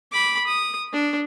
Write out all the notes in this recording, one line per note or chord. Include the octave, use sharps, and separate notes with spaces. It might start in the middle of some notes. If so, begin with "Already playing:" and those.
B5 D6
D#6
D4